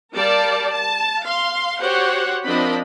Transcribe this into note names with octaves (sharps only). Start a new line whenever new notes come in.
G3 A#4 D5 F5 A5
A5
F5 C6
F#4 G4 C5 C#5 F#5
F3 C4 D4 A#4 D#5 B5